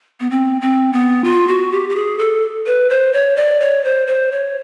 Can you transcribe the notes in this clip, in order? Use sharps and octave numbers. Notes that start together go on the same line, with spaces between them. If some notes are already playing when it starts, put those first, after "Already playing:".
B3
C4
C4
B3
F4
F#4
G4
G4
G#4
A4
B4
C5
C#5
D5
C#5
C5
C5
C#5